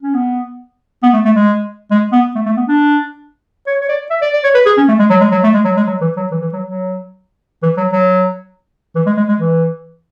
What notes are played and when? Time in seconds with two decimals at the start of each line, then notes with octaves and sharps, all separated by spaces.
0.03 C#4
0.14 B3
1.03 B3
1.13 A3
1.25 A3
1.36 G#3
1.91 G#3
2.12 B3
2.35 A3
2.46 A3
2.57 B3
2.68 D4
3.67 C#5
3.81 C#5
3.89 D5
4.10 E5
4.22 D5
4.34 D5
4.44 C#5
4.55 B4
4.66 G#4
4.78 C#4
4.88 A3
4.99 G#3
5.10 F#3
5.21 G#3
5.31 F#3
5.44 A3
5.54 G#3
5.65 F#3
5.77 G#3
5.87 F#3
6.01 E3
6.17 F#3
6.32 E3
6.42 E3
6.53 F#3
6.65 F#3
7.63 E3
7.77 F#3
7.92 F#3
8.95 E3
9.06 G#3
9.17 G#3
9.29 G#3
9.39 E3